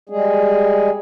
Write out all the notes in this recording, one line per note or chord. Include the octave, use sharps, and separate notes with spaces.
G3 G#3 G#4